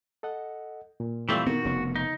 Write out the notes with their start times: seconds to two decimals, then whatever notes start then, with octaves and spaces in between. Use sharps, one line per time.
0.23 A4 D#5 F#5
1.00 A#2
1.29 E3 G3 A3 C4 F4 G4
1.46 D#3 B3 F#4
1.65 F1 C#3 B3
1.96 D#4